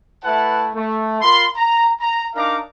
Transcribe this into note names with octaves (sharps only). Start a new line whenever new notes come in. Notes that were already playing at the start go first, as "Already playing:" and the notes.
A3 E4 B4 F#5 A5
A3
F4 A#4 B5 C6
A#5
A#5
D4 D#4 A#4 F5 A#5 D6